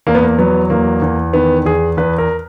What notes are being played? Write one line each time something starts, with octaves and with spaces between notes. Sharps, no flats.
E2 A#3
B3
A#3
F#3 B3
E2 A#3
E2
D#3 B3
E2 G#4
E2 B4
A#4